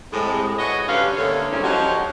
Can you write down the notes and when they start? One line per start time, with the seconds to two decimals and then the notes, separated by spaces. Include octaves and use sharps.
0.13 A2 C3 G#3
0.58 F#4 G#4 B4 C#5 D#5
0.89 G2 D3 G3 C#4 B4 F5
1.17 D3 D#3 A3 A#3 C#5
1.51 G#2 C3 F#3 G3 C#4 E4
1.64 F3 F#3 C#4 D#4 F#4 G4